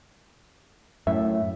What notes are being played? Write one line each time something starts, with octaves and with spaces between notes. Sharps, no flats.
F#2 A2 E5